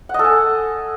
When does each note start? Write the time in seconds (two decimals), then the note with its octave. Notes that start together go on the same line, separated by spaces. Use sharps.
0.09 F#5
0.14 D#5
0.19 A4
0.24 G#5